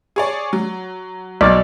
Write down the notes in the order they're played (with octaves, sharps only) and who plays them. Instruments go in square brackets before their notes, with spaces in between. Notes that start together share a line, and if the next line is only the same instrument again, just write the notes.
[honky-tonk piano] G#4 C#5 D5
F#3
[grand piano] B1 [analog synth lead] D5 [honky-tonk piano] C#6 F6